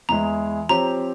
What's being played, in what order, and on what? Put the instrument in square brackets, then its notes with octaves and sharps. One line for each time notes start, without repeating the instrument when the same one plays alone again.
[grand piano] E2 E3 G#3 E4 [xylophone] A#5
[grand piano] F3 C4 G4 C#5 [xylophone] A#5